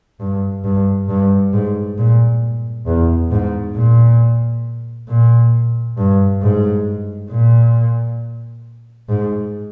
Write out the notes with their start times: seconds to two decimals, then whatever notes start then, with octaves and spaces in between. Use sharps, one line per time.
0.20 G2
0.64 G2
1.09 G2
1.53 G#2
1.98 A#2
2.86 E2
3.31 G#2
3.75 A#2
5.09 A#2
5.98 G2
6.42 G#2
7.30 A#2
9.09 G#2